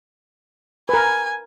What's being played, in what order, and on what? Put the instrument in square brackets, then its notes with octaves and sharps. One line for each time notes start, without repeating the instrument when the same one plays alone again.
[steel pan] A#4 B4 [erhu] G#5